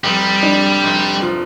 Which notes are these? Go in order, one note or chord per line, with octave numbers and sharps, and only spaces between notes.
F1 G3
D4
F1
F3